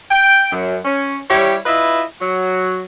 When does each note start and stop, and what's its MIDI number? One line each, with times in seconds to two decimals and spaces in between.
0.11 0.49 79
0.52 0.77 42
0.85 1.20 61
1.30 1.58 55
1.30 1.58 64
1.30 1.58 67
1.30 1.58 73
1.66 2.03 64
1.66 2.03 65
1.66 2.03 71
1.66 2.03 75
1.66 2.03 76
2.21 2.85 54
2.21 2.85 66